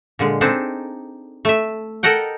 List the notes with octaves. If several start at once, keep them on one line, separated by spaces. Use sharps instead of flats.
A#2 D3 G#3
C4 D4 D#4 G#4 A4
A3 E5
A4 A#4 D#5 F#5 G5